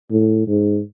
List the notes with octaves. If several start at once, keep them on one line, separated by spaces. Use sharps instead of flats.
A2
G#2